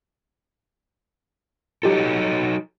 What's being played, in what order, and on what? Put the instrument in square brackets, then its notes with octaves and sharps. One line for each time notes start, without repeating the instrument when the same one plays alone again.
[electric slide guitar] F#3 D#4 A4 [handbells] F4 G4